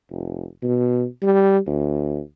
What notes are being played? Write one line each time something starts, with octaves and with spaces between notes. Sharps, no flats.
F1
B2
G3
D2